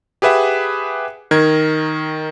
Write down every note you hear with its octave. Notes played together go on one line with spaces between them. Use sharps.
G4 G#4 B4 E5 F#5
D#3 A#4 G#6